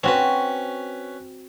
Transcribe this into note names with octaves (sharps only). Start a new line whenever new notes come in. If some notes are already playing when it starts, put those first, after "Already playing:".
C4 C#4 F#4 B4